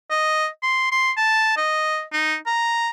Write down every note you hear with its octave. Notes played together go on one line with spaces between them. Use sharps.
D#5
C6
C6
A5
D#5
D#4
A#5